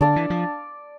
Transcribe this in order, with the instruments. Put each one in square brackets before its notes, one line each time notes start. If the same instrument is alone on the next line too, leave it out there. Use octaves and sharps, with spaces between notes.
[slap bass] D3 [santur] D4 A4 D5 F5
[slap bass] E3
F3